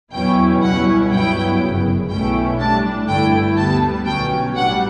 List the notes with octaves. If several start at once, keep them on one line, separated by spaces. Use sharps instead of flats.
E2 B2 F#3 C#4 E4 G5
C#2 B2 G3 C#4 E4 F#5
G2 F#3 B3 E4 G5
G1 F#2 C#3
B1 B2 A3 C#4 E4 G5
A2 G3 D4 A5
G1 G2 D3 A3 E4 G5
D2 D3 G3 B3 A5
B1 B2 F#3 C#4 G5
A1 A2 G3 D4 F#5